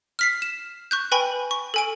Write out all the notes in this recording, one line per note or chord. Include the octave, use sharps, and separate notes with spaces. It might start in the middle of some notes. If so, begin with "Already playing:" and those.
F6 B6 C7
E7
C#6 F#6 G6
B4 G5 G#5 B5 C#6
C#6
A4 G#5 D7